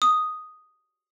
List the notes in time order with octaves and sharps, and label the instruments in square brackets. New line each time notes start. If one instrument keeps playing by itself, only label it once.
[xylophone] D#6